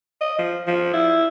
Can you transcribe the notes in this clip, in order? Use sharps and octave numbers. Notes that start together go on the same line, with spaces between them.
D#5
F3
F3
E4